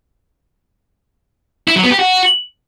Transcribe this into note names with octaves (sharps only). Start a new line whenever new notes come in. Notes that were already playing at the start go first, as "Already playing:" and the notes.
E4
F#3
B3
G4
F#4